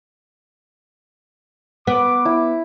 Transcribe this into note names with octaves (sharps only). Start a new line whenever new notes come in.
B3 D6
E4